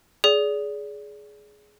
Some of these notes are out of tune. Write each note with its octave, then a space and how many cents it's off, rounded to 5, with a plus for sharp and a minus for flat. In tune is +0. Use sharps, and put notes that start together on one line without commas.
G#4 +10 D5 -30